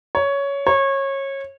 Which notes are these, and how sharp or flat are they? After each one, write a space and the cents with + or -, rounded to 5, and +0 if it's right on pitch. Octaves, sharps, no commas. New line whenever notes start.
C#5 +10
C#5 -25